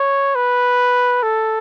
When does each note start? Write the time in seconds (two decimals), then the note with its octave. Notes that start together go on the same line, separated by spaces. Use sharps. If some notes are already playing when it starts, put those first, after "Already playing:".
Already playing: C#5
0.35 B4
1.23 A4